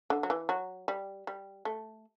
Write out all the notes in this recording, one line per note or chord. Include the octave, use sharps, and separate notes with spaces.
D3
F#3
E3
F#3
G3
G3
A3